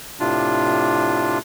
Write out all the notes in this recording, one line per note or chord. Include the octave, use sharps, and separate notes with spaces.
A2 C3 D4 F4